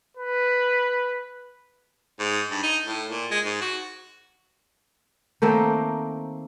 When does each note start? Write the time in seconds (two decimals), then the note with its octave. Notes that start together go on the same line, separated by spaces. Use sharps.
0.17 B4
2.19 G#2
2.51 G2
2.63 D#4
2.85 A2
3.09 A#2
3.31 G#3
3.44 G#2
3.61 F#4
5.42 D#3 A3 A#3 C4